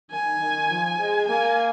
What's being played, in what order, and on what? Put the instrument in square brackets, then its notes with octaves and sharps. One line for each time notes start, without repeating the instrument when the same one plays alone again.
[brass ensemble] D#3 [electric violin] G#5
[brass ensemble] D#3
F3
G#3
[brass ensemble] A#3 [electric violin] G#5